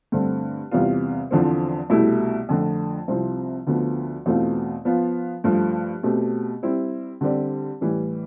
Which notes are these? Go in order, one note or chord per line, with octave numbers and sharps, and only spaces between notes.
G2 D3 A3 C4
E2 C3 G3 B3 F4
E2 D3 F3 C4
C2 B2 A3 E4 G4
F2 D3 A3
C2 C3 F3 C4
D2 D3 F3 B3
E2 B2 A3 C4 F4
F3 B3 F4
G2 F3 A3
B2 A3 C4 G4
G3 C4 E4
D3 G3 C4 G4 D5
A2 E3 G3